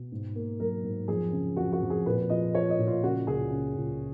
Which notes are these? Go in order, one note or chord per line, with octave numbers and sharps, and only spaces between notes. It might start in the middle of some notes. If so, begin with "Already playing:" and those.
Already playing: B2
G#2
A#3
F#3 A#4
G#2
F2 G#4
C#3
F2 F#4
F#4
F2
G#4
A#2 B4
F3 D#5
F3 C#5
D#5
A#2
F4
C#3 F#4
C#2 G#4
C#3
C#2